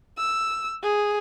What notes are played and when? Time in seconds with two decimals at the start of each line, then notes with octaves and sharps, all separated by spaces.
0.18 E6
0.83 G#4